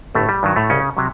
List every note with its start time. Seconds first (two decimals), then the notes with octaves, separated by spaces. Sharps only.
0.15 G1 A2 A3
0.29 G3
0.43 G2 D#3 F#3
0.56 A2 A3
0.70 C2 C#3 C#4
0.97 C3 F#3